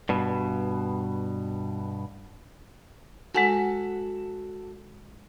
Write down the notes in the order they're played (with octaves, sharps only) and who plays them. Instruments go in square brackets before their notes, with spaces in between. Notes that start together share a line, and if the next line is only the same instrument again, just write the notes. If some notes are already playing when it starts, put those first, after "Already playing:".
[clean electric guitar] G2 B2
[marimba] G#3 F#5 G#5 [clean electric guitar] F#4 A4